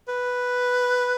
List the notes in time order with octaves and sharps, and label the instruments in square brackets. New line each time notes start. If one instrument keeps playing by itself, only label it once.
[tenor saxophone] B4